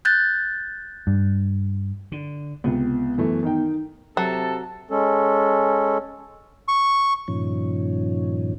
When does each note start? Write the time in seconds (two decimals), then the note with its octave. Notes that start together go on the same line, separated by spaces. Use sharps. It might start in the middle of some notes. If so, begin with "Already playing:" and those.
0.05 F#6 G6 A6
1.07 G2
2.12 D3
2.64 C#2 C3 B3
3.18 F#2 E3 A3
3.43 D#3 D#4 G5
4.17 C3 F#3 A4 A5
4.90 G#3 C#4 A4
6.68 C#6
7.28 G2 A#2 D#3 F3 C#4